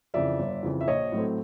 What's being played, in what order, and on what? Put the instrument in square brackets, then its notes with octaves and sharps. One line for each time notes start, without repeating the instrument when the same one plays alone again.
[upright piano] F2 C#3 E3 D5 E5
G1
F2 C#3 E3
E5
A#1 C#5 D#5
A2 F#3 A3 C4